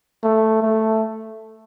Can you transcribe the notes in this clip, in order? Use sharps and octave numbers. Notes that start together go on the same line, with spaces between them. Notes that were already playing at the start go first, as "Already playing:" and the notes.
A3
A3